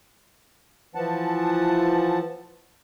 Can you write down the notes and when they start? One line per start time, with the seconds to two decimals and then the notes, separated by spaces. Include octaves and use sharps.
0.95 E3 F3 F#5 A5